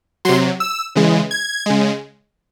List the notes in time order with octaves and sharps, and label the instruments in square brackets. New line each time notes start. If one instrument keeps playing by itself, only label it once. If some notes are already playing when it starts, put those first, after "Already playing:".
[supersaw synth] C3 F#3 C6
E6
C#3 E3 G#3
G#6
C#3 G#3